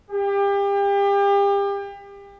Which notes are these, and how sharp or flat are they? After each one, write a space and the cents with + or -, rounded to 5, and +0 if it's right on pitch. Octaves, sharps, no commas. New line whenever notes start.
G4 +35